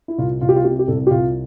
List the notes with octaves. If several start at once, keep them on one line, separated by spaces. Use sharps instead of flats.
E4
C2 F4
C2 F4
G4
F4
C3 G4
G4
C2 A4
G4
C2 F4